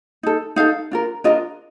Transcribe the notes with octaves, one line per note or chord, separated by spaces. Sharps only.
D#4 A4
D#4 A4 F5
D4 F4 A#4
D4 F4 A#4 D#5